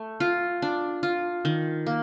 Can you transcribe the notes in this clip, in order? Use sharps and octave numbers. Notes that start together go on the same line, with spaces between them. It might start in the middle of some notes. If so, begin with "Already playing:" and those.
Already playing: A3
F4
D4
F4
D#3
A#3